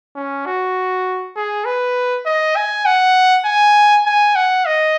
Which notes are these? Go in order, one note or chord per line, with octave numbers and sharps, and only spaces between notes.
C#4
F#4
G#4
B4
D#5
G#5
F#5
G#5
G#5
F#5
D#5